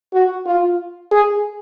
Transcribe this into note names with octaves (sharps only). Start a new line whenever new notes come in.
F#4
F4
G#4